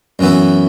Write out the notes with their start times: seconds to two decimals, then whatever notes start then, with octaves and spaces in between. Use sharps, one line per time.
0.19 F#2 E3 B3 E4